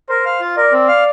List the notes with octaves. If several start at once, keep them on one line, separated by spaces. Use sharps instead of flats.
A#4 C5
F5
F4
A#4 D5
C4
F5